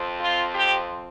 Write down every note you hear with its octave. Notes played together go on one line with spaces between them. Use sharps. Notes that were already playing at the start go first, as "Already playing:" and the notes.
Already playing: F2 F3 C4
F4
G4